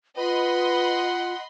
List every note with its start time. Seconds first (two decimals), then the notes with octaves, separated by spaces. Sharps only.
0.17 F4 B4 D#5 F#5 B5 C6